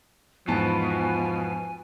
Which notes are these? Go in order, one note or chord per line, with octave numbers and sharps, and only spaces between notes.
E2 G#2 B2 F3 G#5 A5